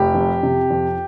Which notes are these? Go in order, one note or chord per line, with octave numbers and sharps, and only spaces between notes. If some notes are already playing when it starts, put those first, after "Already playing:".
Already playing: F1 G4
F2
C3
F2